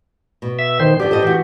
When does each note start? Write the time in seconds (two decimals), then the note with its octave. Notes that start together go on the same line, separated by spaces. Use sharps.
0.42 B2
0.59 E5
0.80 D#3 C5
1.00 D3 F3 F#4 G4
1.11 A4 C5 D#5
1.22 E3 F#4